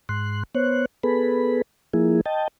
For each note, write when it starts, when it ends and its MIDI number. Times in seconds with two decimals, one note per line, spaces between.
0.09 0.43 44
0.09 0.43 84
0.09 0.43 90
0.55 0.86 59
0.55 0.86 72
0.55 0.86 73
0.55 0.86 90
1.03 1.62 59
1.03 1.62 68
1.03 1.62 69
1.03 1.62 71
1.03 1.62 83
1.94 2.21 53
1.94 2.21 58
1.94 2.21 64
1.94 2.21 68
2.26 2.48 75
2.26 2.48 79
2.26 2.48 81